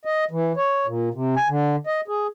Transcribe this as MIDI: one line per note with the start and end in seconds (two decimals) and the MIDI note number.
0.05 0.24 75
0.31 0.53 52
0.57 0.86 73
0.86 1.09 46
1.14 1.35 48
1.36 1.48 80
1.49 1.76 50
1.87 2.01 75
2.08 2.27 68